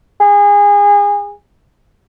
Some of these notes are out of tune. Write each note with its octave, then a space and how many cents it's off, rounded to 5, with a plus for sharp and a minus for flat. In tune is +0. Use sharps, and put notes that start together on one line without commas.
G#4 -30